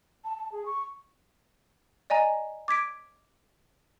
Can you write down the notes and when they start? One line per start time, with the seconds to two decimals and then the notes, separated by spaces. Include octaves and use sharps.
0.24 A5
0.38 A5
0.52 G#4
0.66 C#6
2.10 D5 D#5 G#5 A#5
2.68 D6 G#6 B6 D7